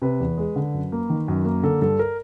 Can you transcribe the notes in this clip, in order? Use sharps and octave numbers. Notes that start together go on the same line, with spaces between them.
C3 B4
E2
G#3
D3
F#2
A#3
D#3
F#2
A#3
D3 A4
G2 A4
A#4